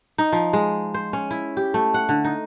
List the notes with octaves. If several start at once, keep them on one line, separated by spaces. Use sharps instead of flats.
D#4
F3
G#3
C5
C#4
E4
G4
A3
F#5
D3
D#4